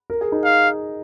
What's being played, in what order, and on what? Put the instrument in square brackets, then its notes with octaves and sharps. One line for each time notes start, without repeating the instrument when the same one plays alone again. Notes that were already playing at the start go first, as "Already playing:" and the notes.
[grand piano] A#4
G#4
D#4
[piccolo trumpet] F5